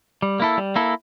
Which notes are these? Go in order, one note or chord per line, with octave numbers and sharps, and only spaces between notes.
G3
A#3 E4 A4
G3
A#3 E4 A4